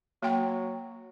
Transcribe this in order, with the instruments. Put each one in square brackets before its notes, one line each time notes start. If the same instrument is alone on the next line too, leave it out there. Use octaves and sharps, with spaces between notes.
[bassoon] F#3 [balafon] A#3 G5